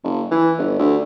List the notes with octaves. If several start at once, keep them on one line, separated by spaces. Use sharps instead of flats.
F#1
E3
G1
D2